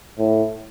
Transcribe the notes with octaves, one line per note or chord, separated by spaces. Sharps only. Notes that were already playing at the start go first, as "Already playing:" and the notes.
A2